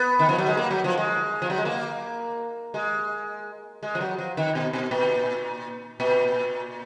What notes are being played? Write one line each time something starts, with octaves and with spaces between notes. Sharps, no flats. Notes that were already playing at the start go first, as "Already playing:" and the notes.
Already playing: B3
D#3
F3
F#3
G#3
A#3
F#3
F3
G#3
F3
F#3
G#3
A#3
G#3
G#3
F3
F#3
F3
D#3
B2
B2
A#2
A#2